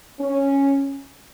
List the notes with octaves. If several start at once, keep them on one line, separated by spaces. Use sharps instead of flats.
C#4